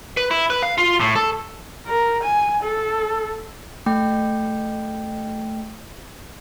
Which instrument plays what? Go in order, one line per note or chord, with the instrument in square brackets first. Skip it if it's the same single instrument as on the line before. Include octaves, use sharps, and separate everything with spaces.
[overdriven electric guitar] B4
E4
B4
F5
F4
A2
A4
[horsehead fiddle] A#4
G#5
A4
[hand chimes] A3 G5